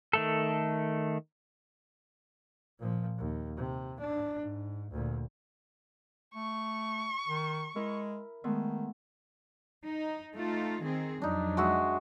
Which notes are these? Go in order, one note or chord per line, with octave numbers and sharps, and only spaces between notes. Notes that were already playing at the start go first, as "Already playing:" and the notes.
D#3 A3 A4
A#2 F3
D#2
C3
D4
G#2
D2 A#2
A3 C#6
D#3
G#3 E4 A#4
D#3 G#3 A3 B3
D#4
A3 D#4 F4
D#3 C4 G#4
F2 F#3 D4 D#4
G#3 F#4 E5